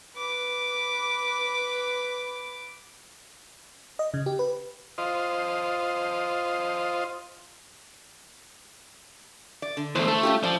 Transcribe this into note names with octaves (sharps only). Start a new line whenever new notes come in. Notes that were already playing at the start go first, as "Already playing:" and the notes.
B4 D6
D#5
C#3
G4
B4
F4 C5 D#5
D5
D3
E2 A3 C5
A3 A4
C#4 F4 G4
F3 D5